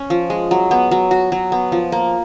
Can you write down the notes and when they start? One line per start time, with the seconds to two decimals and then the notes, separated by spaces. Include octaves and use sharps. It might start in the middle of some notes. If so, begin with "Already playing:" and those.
Already playing: C#4
0.10 F3
0.30 G#3
0.51 F#3
0.71 B3
0.91 F#3
1.11 F#4
1.32 F#3
1.52 B3
1.72 F3
1.92 A#3